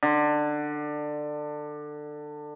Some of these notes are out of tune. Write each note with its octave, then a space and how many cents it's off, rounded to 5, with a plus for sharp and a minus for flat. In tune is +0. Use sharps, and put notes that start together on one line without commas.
D3 +20